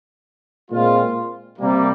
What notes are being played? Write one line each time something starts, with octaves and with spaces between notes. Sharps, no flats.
A#2 G#3 C4 F4
C3 G3 A#3